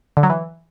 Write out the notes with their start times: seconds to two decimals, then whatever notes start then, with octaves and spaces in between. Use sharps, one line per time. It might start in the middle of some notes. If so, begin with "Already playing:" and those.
0.17 D3
0.23 F#3
0.30 E3